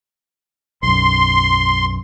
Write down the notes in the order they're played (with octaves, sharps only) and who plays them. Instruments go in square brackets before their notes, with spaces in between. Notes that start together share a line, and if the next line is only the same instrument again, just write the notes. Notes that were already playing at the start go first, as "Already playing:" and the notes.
[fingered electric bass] B1 F#2 [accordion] C6